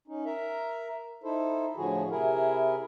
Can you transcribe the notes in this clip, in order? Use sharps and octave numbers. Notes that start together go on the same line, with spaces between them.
C#4 D#4
A#4 E5 A#5
D#4 E4 A4 C5
A2 D3 F3 F#4 G#4
C3 E4 G#4 A#4